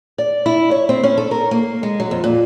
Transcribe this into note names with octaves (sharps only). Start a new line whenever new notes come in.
D5
E4
C#5
C4
C#4
A4
A#4
A#3
G#3
F#3
F2
A#2